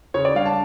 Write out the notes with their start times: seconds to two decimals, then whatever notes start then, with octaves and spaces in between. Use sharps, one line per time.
0.14 C#3 C#5
0.25 D5
0.35 G3 D4 F5
0.46 A5